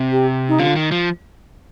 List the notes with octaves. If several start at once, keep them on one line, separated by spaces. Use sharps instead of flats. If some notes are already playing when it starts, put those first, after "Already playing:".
Already playing: C3
G4
D#4
D3 F4
D#3
F3